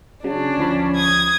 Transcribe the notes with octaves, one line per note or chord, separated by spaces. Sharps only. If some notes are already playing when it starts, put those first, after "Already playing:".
C#3 F#3 C#4 D4
D2 F3 B5
D#6 G#6